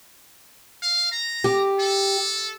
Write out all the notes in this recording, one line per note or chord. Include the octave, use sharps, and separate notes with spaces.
F5
A#5
G4
A4